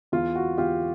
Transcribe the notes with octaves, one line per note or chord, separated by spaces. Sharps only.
E2 F4
F#4
E2 F4 G4